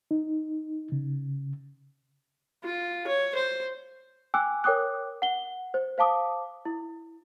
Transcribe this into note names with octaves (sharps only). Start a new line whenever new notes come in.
D#4
C#3
F4
C#5
C5
G5 G#5 D6 E6 F#6
A#4 C#5 G5 D6 D#6 F#6
F#5 G7
C5
C5 F5 A5 D6 D#6
E4